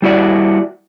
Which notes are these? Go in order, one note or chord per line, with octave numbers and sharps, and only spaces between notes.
G3 E4 F#4 D5